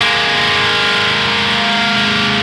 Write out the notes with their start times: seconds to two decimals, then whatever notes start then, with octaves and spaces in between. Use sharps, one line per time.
0.01 G#3 A#3